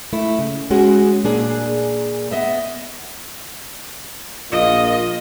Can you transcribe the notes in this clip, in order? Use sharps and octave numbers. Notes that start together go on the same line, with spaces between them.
A3 E4
C#3
G#3 C#4 F#4 G#4
A#2 A#3 D4 G#4
B3 D#5 E5
A#1 A#3 F4 D#5